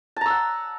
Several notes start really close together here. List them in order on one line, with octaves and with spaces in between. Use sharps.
A5 A#5 E6 F#5